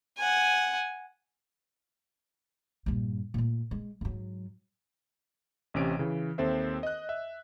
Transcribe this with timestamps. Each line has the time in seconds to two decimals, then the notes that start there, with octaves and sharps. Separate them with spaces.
0.18 F#5 G#5
2.86 G2 A#2
3.34 A#2 A3
3.71 G#3
4.01 G#2 F#3
5.74 A1 C3 C#4 D7
5.99 C#3 E3
6.38 D#2 C4 A4 C5 E5
6.83 D#5 F#6
7.09 E5